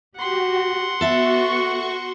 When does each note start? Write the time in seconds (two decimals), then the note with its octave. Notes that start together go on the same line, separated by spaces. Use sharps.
0.17 F#4 G4 F#5 C6
1.01 B3 F#4 A4 E5 C#6